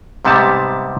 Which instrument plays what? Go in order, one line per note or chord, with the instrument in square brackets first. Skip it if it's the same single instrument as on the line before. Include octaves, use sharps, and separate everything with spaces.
[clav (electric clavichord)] G#2 C3 G3 B3 A5